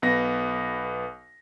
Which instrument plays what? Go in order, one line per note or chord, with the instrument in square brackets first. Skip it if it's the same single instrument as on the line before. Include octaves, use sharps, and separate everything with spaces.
[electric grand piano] B1 B3 A#6